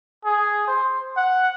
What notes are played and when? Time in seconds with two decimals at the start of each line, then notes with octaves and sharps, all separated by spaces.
0.25 G#4
0.68 C5
1.17 F#5